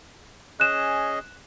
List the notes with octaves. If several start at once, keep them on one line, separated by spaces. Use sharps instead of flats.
C#4 G#4 D#5 F#6 E7